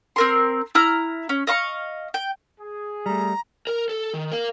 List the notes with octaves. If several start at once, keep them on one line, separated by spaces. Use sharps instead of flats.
C4 A#4 C6
E4 A#5 F6
C#4
D#5 F5 C6 C#6
G5
G#4
G3 A3 A#5
A#4
A4
D#3
A#4 F5